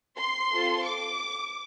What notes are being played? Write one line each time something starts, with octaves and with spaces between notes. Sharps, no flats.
C6
C4 F4 A4
D6